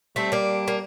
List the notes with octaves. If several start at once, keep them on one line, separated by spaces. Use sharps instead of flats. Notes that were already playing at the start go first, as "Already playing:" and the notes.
G3 A3 C4
A#3 D4
A#3